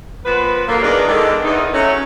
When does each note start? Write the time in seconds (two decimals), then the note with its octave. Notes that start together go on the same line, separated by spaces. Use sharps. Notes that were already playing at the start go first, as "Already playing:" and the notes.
0.25 A#2 F3 B3 B4
0.67 B2 D3 F#3 A#3
0.82 E2 D#3 G#3 D4 A#4 B4
1.08 D3 D#3 G#3
1.43 E2 D#4
1.73 F#3 A3 C#4